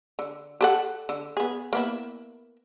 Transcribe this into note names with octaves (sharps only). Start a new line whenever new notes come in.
D3
G4 A4 F#5
D3
B3 G#4
A#3 B3 E4